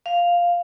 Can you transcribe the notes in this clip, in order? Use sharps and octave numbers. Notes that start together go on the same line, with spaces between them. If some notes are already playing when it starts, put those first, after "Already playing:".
F5